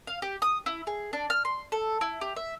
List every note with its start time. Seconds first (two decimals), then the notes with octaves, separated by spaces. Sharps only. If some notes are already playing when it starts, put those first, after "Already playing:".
0.07 F5
0.22 G4
0.42 D#6
0.66 E4
0.87 G#4
1.13 D4
1.30 F6
1.45 C6
1.72 A4
2.01 E4
2.21 G4
2.36 E5